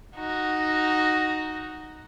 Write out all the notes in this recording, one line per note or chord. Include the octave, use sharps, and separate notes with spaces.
D#4 F#4